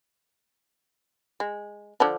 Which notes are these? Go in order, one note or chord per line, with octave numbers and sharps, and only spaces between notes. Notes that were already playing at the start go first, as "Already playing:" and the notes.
G#3
D3 F3 D4